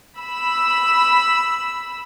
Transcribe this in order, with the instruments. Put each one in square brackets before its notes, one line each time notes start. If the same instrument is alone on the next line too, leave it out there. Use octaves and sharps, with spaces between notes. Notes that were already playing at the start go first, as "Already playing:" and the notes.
[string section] B5 E6